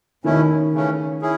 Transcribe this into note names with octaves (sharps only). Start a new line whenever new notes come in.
E2 B2 D#3 A3 C#4 E4
C#3 E3 A3 C#4
C#4 E4 G#4